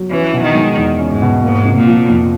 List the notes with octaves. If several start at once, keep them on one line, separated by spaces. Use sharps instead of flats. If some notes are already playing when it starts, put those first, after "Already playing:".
Already playing: F#3
E3 C#4
B2
D#3
G#3
E2
C#4
G#2
B2
G#2 A#3
C3
A#2
F3
F2